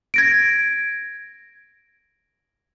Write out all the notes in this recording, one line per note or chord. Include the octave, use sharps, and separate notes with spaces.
G#6 A#6 D7